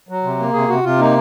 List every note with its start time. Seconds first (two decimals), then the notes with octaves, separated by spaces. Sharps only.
0.09 F#3
0.23 C3
0.39 A#3
0.53 C3 G#4
0.69 C3 F#4
0.83 C3 F4
0.99 A#3 D#4